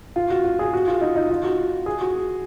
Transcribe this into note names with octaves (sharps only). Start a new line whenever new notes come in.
F4
F#4
F#4
G#4
F#4
F4
D#4
D#4
F4
F#4
G#4
F#4